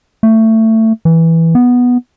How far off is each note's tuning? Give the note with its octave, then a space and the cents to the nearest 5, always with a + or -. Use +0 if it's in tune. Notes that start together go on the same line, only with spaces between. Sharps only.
A3 +20
E3 -5
B3 -5